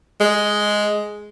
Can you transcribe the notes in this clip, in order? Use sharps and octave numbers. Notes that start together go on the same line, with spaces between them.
G#3